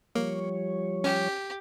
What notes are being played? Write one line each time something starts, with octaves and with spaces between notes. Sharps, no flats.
F3 G3 A#3 C#5
C#4 G4